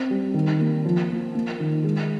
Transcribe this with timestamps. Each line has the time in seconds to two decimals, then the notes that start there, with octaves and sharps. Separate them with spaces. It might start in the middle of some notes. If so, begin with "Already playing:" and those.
Already playing: C4
0.10 G3
0.34 D#3
0.59 A#3
0.85 F3
1.10 A#3
1.35 A#3
1.60 D#3
1.84 G#3